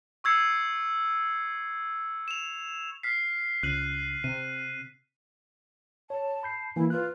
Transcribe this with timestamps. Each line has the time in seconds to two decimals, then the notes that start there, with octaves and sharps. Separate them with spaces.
0.24 C#6 E6 G#6 C7 C#7
2.28 E7 F7
3.03 F6 B6 C7
3.63 C#2 F#6 D#7 F#7
4.24 C3 D#7
6.10 C#5 A5
6.43 B5 G6 C7
6.76 E3 A#3 E4 G#5
6.90 F4 B4 F#6